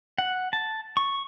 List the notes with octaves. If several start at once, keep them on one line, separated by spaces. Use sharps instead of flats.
F#5
A5
C#6